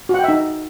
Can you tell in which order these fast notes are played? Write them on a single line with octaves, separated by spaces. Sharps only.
F#4 F#5 G5 E5 D#4